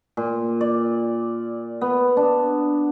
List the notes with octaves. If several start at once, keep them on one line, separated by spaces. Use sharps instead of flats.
A#2
D5
B3
D4